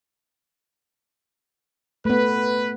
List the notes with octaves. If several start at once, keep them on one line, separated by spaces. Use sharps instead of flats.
A3 B3 B4